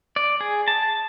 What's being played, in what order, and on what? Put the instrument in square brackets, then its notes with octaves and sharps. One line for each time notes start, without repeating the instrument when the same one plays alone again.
[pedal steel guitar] D5
G#4
A5